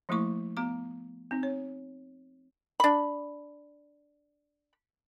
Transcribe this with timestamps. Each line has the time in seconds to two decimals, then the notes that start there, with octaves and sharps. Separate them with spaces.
0.09 F3 A3 A#3 E4 C#6 D6
0.57 B3 A#5 D6
1.31 C4 D#4
1.43 C#5
2.80 D4 B5